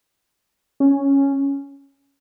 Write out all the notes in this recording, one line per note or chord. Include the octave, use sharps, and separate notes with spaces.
C#4